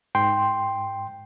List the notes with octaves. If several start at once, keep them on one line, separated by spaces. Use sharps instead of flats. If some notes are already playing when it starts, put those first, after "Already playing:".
G#2 G5 C6